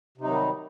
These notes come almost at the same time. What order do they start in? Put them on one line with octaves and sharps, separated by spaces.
C3 D#4 F#3 D#3 G3